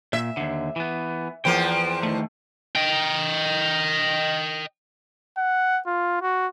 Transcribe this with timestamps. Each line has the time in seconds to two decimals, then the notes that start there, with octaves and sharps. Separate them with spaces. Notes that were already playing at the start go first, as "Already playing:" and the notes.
0.13 A#2 E5
0.37 D#2 D3
0.76 E3 B3
1.45 E2 F3 A#3 G5
2.03 D#3 A3
2.76 D#5 G5
5.37 F#5
5.87 F4
6.22 F#4